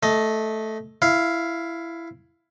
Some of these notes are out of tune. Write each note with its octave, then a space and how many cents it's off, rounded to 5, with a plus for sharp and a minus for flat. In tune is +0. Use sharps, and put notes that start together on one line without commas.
A3 -5 D#5 +15
E4 +15 F5 +0